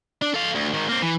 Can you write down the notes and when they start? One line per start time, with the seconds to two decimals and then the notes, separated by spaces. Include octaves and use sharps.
0.22 D4
0.34 A4 F5
0.55 D2
0.74 G#2 D#3
0.89 A#3 C4
1.02 E3